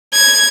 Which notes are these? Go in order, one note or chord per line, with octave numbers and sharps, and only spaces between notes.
G#6